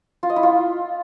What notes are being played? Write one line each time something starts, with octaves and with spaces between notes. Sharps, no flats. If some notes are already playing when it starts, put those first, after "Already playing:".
F4
D#5
E4
F4